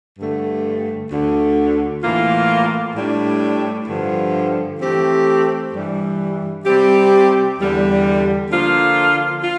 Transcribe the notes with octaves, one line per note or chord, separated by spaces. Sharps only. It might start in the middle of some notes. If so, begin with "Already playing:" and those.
G2 D3 A3
D2 D3 A3
A2 E3 A#3 F4
A2 G3 D4
G2 D3 F3
E3 A3 C4 G4
G2 E3 G3
C3 G3 C4 G4
E2 D3 G3
D3 F3 A#3 F4
F4